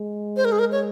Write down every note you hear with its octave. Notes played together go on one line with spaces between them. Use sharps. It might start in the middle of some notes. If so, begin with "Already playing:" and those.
Already playing: G#3
C5
A#4
G#4
A#4
C#5